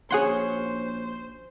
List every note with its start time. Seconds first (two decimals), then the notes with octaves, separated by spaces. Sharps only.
0.11 A#1 C#4 F#4 G#4 C5 C#5 F#5 C6